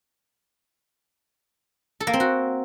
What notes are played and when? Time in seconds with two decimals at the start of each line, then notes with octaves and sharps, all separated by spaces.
2.00 A4
2.07 A#3
2.13 C4
2.20 F#4